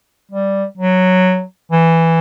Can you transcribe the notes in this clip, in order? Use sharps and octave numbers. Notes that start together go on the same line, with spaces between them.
G3
F#3
E3